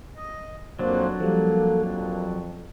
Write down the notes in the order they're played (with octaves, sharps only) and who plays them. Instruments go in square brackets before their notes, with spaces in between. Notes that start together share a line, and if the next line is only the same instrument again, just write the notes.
[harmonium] D#5
[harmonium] F2 A#3 [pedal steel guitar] F#3 D4 [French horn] C5
[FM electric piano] F3 G3 [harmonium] A#3 [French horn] A4
[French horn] F2